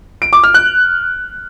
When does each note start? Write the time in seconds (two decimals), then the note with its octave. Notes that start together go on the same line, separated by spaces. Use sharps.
0.22 D7
0.33 D6
0.43 F6
0.54 F#6